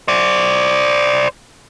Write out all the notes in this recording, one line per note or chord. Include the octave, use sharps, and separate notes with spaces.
C5 D5